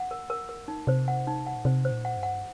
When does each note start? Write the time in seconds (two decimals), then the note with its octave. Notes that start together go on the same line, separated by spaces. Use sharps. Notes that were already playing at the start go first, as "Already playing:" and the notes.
Already playing: F#5
0.11 A#4
0.30 A#4
0.49 A#4
0.68 D#4
0.87 C3 C5
1.08 F#5
1.27 D#4
1.47 F#5
1.56 A#2
1.65 C3 C5
1.85 C5
1.91 A#2
2.05 F#5
2.17 G2
2.23 F#5